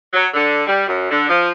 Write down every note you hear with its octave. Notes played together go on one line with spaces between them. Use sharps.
F#3
D3
G3
F#2
D3
F3